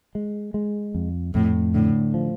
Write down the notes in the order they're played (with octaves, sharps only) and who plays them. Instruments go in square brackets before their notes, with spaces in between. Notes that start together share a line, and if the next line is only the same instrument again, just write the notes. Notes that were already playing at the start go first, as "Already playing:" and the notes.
[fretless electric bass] G#3
G#3
F2
[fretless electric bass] F2 [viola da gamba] A2
[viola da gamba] A2 [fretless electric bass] D3
[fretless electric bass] F3